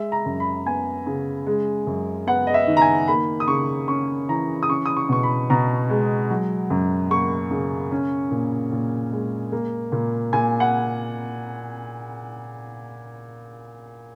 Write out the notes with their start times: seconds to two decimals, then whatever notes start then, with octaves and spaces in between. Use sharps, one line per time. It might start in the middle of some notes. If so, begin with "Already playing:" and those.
Already playing: G#3 E5
0.12 A#5
0.26 F#2
0.40 B5
0.66 B3 G#5
1.07 C#3
1.47 G#3
1.87 F#2
2.27 B3 F#5
2.47 D#5
2.54 E5
2.67 D#3
2.77 A#5
2.82 G#5
3.08 A#3 B5
3.40 D#6
3.48 C#3 C#6
3.88 C#4 C#6
4.29 E3 A#5
4.63 D#6
4.69 C#4 C#6
4.86 D#6
4.97 C#6
5.09 B2 C#6
5.23 B5
5.50 B2 A#5
5.90 G#3
6.30 F#3
6.70 F#2
7.11 A#3 C#6
7.51 C#3
7.91 C#4
8.31 A#2
8.72 A#2
9.12 G#3
9.52 A#3
9.92 A#2
10.33 A#2 G#5
10.60 F#5